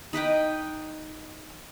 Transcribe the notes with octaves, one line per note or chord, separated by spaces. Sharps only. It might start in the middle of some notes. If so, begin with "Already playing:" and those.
D#4 B4 D#5 G5